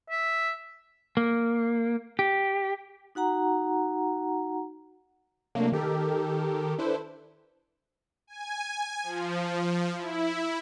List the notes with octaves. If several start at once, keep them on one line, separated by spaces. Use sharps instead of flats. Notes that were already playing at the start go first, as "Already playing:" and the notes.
E5
A#3
G4
D#4 F#4 F#5 A#5
C3 F#3 A3 A#3 D4
D#3 G4 A4 A#4
D4 E4 A4 B4 C5
G#5
F3
E4